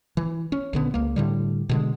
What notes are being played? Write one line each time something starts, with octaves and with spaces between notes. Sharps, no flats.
E3
C#4
A#1 D3 B3
C#2 A#3
A2 D3 G3
B2 D3 G#3